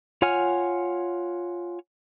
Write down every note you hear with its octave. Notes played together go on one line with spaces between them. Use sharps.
F4 C#5 F#5 G#5 F6